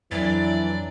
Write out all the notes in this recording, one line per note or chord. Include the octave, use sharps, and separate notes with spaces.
F2 E3 F#3 D4 D5 B5 A6